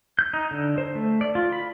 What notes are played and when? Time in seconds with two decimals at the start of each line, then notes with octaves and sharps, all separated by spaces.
0.19 G6
0.33 D#4
0.51 D3
0.78 C5
0.95 A3
1.21 D5
1.35 F4
1.52 B5